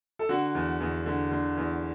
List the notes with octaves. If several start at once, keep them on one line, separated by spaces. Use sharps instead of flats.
A4
D3 F#4
E2
E2
D3
D3
E2